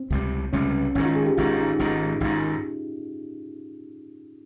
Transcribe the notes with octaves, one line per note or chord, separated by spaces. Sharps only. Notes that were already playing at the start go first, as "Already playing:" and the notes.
Already playing: C4
C#2 C3 G3
C#2 C3 G3 C#4
C#4
G#1 G#2 D#3 C#4
F4
G#4
G4
G#1 G#2 D#3 F4
D#4
G#1 G#2 D#3
G#1 G#2 D#3